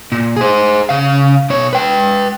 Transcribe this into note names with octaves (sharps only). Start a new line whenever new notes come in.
A#2
G#4 C5
C#3 F5
B2 C#5
B4 G5